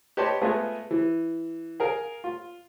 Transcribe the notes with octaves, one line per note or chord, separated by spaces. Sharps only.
G4 B4 C#5 D#5 A5 C6
G#3 A3 B3 F4 G#4
E3
G#4 A#4 F5
F4